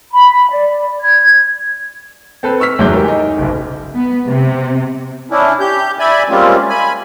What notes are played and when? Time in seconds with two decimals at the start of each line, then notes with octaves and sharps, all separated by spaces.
0.12 B5
0.52 D5
1.02 G#6
2.43 C4 A4 B4
2.60 C#6 E6 F6 B6
2.79 E2 G#2 F#3 D6 G6
2.93 G4 A#4
3.08 D#4
3.38 F#1 B1
3.94 B3
4.27 C3
5.31 C#4 D4 E4
5.60 G4 G6
5.99 D5 E5 G#5 B5
6.29 G3 G#3 A#3 C4 C#4 F4
6.69 G#5 B5